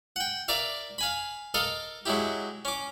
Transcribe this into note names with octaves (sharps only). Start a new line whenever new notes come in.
F#5 G5
A#4 D5 E5 F5
F5 G#5 B5
A4 A#4 D#5 F5
F#3 G#3 E4 G4
C#4 D6